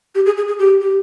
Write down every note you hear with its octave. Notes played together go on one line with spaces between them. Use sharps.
G4
G#4
G#4
G#4
G4
G4